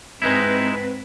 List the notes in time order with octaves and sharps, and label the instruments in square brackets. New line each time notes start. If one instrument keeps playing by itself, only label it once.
[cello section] G#2 C4 B4 [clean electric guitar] G#3 D#4 E4